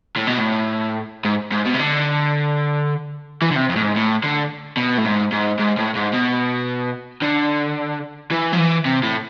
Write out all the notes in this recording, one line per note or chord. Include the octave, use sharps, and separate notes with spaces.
A2
B2
A2
G#2
G#2
B2
C3
D3
E3
D3
C3
F2
A2
G#2
A2
D3
B2
A2
G#2
G#2
G#2
A2
G#2
B2
D3
E3
F3
E3
C3
A2